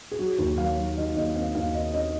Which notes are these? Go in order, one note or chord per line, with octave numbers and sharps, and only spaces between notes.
G#4
F#3 F#4
D#2
F#3 F5
F#3
D#3 D#5
D#2 D#5
C4 F5
D#2 F5
C4 D#5
C4 D#5